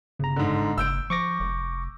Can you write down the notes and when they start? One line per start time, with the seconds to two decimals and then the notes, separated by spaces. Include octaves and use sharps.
0.19 G1 C#3 A#5
0.36 G#2 D3
0.78 F#1 E6 G6 D7
1.10 F3 C#6 D6 A#6
1.40 F1